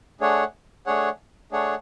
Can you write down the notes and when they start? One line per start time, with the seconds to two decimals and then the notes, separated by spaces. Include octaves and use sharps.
0.20 A3 D4 G#4 C#5 F#5
0.86 A3 D4 G#4 C#5 F#5
1.52 A3 D4 G#4 C#5 F#5